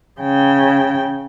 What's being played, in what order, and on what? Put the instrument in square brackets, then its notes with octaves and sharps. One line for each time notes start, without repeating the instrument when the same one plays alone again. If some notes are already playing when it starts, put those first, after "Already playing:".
[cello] C#3 G5